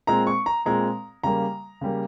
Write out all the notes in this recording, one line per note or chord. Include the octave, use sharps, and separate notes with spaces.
A#2 G#3 C4 A#5
C#6
A#5
A#2 G#3 C4 A#5
C#3 G3 A#3 A#5
C#3 G3 A#3